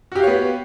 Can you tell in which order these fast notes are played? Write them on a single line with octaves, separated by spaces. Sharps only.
F#4 G4 F5 C#5 B3